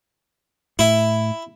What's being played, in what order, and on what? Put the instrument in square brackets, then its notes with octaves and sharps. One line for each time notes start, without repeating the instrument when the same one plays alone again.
[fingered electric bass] A2 [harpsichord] E4